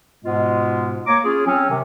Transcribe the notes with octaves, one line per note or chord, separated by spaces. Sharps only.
G#2 B2 G#3 B3 F4
A#3 C#5 A#5 D6
C#4 F4 G#4
F#3 C4 C#4
C3 D#3